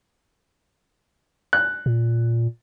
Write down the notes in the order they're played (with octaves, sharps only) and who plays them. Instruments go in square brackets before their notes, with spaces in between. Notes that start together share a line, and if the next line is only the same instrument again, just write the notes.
[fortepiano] F#6
[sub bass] A#2